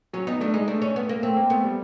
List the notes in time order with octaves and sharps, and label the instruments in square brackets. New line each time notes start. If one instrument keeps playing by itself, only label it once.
[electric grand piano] F#3 [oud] C#4
[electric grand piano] B3 [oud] D#4
[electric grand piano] A3 [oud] D4
[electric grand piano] G#3 [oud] D#4
[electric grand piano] A3 [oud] D4
[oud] C#4
B3
A#3
[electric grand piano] A3 [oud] C4
[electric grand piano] A#3
[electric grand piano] A3 [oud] B3
[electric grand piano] G3